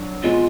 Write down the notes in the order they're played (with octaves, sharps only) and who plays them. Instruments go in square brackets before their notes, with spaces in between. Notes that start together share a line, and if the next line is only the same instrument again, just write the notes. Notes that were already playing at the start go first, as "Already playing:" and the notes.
Already playing: [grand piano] F#3 D4
[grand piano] B2 G#3 B3 [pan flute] F4